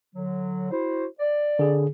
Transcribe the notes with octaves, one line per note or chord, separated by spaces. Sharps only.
D3 F#3
E4 F#4 C5
D5
D3 G#4